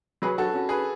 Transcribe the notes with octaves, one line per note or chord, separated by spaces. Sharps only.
F#3 G#4 B4
F#4 A4
C#4 F#4
G#4 B4